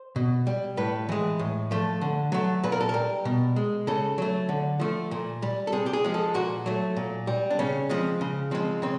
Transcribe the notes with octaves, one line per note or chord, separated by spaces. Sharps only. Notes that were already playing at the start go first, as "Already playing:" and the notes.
Already playing: C5
B2
G3
A2 B4
E3 G#3
A2
F3 A3
D3
F#3 A3
A#2 B4
A#4
A4
G3 A#4
B2
G#3
C#3 A4
F#3 A3
D3
F3 A3
A#2
G3
A4
C3 G#4
G4
G#4
F3 G#3
A4
A#2 F#4
F#3 A3
A#2
G3
D4
C#3 C#4
F3 G#3 C4
C#3
F3 G#3 C4
C#3 C4